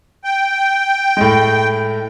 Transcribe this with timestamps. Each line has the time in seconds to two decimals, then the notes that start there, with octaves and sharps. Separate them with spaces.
0.24 G5
1.17 A2 G#3